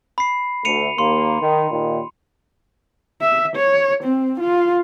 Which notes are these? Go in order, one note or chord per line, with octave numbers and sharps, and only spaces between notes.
B5 C7
D2 A3 C#7 D#7 F7
D#2 A#3 C6
D#3
D#2 A#2 D#3
E5
C#5
C4
F4